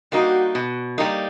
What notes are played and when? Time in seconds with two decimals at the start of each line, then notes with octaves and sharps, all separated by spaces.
0.12 G3 A#3 D#4 F#4
0.55 B2
0.98 G3 A#3 D#4